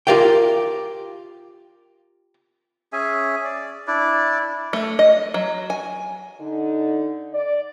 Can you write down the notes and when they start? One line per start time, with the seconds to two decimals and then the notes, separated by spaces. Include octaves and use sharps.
0.07 F4 G4 A#4 D5 F5 G5
2.93 C#4 G#4 E5 G#5
3.44 D5
3.87 D4 E4 D5
4.73 A3
4.99 D#5
5.34 F#3
5.70 G#5
6.40 D3 D#4
7.33 D5